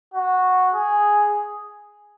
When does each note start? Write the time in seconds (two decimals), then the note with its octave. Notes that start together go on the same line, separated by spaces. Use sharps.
0.14 F#4
0.74 G#4